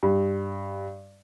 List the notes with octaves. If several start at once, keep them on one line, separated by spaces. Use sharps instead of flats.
G2